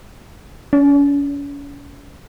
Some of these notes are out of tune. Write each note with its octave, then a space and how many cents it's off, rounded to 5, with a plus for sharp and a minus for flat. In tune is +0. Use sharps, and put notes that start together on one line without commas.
C#4 +40